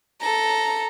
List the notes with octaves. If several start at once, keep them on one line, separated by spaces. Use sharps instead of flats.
A4 A#5